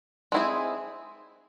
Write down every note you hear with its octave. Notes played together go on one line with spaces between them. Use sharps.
G#3 C4 E4 G#4